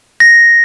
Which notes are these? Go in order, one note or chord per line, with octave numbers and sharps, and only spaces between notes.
A#6